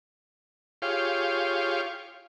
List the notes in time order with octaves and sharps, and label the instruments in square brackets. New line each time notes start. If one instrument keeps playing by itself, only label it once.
[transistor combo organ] F4 G4 G#4 C#5 F5